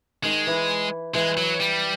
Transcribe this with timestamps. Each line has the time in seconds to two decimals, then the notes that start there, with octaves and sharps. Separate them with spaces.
0.24 D#3 G#3
0.47 E3
1.14 E3 G#3
1.37 F#3
1.60 G3